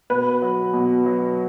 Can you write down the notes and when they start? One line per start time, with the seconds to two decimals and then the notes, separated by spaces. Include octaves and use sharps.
0.10 B2 B4
0.42 F#3
0.73 B2
1.06 F#3